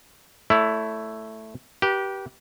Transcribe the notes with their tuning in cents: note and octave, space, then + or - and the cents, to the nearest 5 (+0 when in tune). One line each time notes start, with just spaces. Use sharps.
A3 +0 E4 +5 C#5 +45
G4 -15 B4 -35